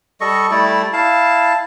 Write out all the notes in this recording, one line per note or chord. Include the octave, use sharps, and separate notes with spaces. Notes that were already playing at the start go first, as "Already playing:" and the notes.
G3 A4 D#5 C#6
G3 A3 E4 D5
E4 F5 A5